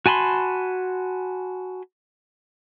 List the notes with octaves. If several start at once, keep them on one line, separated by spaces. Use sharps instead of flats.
F#4 G#5 A5 B5 C6